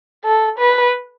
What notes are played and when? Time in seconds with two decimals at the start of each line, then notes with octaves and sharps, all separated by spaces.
0.24 A4
0.59 B4